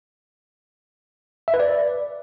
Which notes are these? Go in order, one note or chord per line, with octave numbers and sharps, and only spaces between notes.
E5
B4
D5